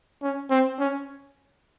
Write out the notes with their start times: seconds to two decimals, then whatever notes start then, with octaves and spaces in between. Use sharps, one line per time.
0.22 C#4
0.50 C4
0.79 C#4